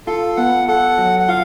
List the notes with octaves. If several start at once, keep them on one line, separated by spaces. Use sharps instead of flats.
F4 A4
B3 F#5
A4 F#5
F#3
F#5
F4 F5